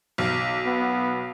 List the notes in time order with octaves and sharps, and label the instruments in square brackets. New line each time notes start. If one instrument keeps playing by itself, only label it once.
[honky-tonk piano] B1
[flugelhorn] B3